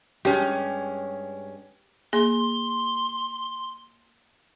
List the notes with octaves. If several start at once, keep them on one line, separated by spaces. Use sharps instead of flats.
G2 G#3 C#4 G4
A#3 G#4 C6